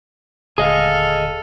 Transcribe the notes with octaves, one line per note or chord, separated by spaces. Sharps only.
D#1 D2 G#4 A4 D#5 F5